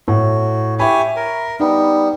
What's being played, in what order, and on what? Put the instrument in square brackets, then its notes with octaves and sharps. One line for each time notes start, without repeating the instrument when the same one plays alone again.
[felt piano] A2 [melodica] F#4
[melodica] G4 C#5 G#5 [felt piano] E5 B5
[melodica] A#4
[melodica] G3 B3 [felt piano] D#4